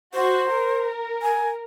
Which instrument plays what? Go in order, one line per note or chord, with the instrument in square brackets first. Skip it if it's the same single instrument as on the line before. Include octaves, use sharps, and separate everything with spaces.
[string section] F#4 [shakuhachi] C5
[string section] A#4
[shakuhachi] G#5